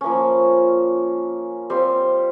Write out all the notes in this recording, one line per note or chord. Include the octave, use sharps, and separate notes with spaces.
F3 A#3 C#4
G3 C4 F4